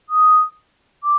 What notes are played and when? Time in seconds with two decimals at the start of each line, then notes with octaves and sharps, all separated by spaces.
0.09 D#6
1.03 D6